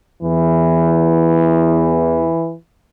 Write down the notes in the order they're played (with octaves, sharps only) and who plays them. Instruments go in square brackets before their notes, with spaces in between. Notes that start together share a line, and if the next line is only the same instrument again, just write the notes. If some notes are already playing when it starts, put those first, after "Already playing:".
[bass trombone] E2 [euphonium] E3